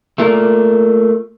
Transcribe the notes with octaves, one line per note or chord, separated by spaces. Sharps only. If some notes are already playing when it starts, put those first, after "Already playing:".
A3 A#3 F4 A#4 D5